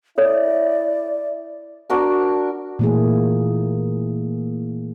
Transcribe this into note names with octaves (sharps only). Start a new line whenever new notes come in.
E4 A4 C#5 D5
D4 F#4 A#4
A#2 E3 A3 A#3 E4 G#4